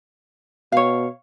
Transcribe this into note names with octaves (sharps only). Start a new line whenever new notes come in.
B2 C#5 F5